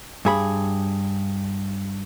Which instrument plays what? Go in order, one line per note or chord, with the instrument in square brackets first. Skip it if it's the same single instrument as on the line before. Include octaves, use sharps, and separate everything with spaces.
[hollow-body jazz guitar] G2 G#4 B5